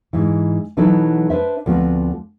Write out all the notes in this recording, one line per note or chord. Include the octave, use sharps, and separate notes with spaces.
G#2 E3
B2 E3 F#3 D#4 E4 A4
D4 B4 C5 E5
D2 F3 B3 C4 F#4